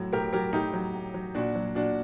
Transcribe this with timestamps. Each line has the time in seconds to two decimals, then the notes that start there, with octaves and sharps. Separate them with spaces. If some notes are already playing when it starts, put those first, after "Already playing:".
Already playing: A2 F#3
0.13 A2 G4 A#4
0.33 F#3 G4 A#4
0.53 A2 D#4 G4
0.73 F#3
0.94 A2
1.14 F#3
1.35 A#2 D4 F#4
1.55 F#3
1.75 A#2 D4 F#4